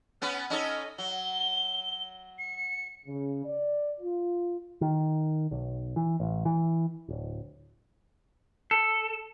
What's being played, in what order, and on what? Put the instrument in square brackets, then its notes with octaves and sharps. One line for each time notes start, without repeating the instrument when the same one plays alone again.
[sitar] B3 C#4 B4 [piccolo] F6
[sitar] C#4 D#4 A4 [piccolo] D#5
[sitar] F#3 [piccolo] G7
[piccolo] C#7
[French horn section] C#3
D5
F4
[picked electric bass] D#3
B1
E3
A1
E3
D1
[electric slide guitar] A4